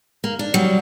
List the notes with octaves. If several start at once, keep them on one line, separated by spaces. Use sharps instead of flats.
A#3
D4
F#3 G3